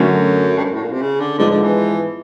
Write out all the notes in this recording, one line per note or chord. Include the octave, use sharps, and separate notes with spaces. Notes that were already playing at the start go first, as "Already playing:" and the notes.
Already playing: F#2 D3 F#3 A3 C#4 F#4
G2
F#2
A2
A#2
C3
C#3
D3
G#2 D3 F3 G#3 B3
D3
E3